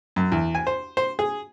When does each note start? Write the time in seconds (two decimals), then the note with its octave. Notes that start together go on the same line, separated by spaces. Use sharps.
0.16 F#2
0.32 E2
0.55 G#5
0.67 C5
0.97 C5
1.19 G#4